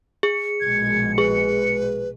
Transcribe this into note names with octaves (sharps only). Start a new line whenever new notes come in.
G#4 C#7
A#1 B2 G#3 G#6
G#4 B4